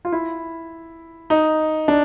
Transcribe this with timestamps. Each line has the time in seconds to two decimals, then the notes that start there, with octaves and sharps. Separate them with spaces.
0.05 F4
0.12 E4
1.30 D#4
1.88 D4